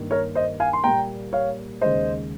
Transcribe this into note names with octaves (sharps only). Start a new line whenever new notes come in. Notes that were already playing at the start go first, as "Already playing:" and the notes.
Already playing: G2 D#3 A#3
A#4 C#5
C5 D#5
F5 G#5
C6
A#2 G3 A#3 G5 A#5
C#5 F5
D#2 C#3 G#3 C5 D#5